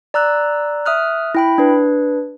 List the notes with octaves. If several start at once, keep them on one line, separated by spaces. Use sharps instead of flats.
D5 A#5 E6 F#6
E5 D#6 F6 F#6
E4 G5 B5
D4 B4